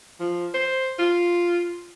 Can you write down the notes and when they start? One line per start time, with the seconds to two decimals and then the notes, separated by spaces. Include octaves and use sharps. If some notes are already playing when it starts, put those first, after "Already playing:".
0.20 F3
0.54 C5
0.99 F4